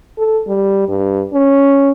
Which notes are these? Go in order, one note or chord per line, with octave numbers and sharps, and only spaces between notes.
A4
G3
G2
C#4